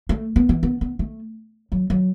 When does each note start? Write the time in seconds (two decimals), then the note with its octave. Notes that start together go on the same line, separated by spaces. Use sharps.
0.09 A3
0.36 B3
0.49 E3
0.63 B3
0.81 B3
0.99 A3
1.72 F#3
1.90 F#3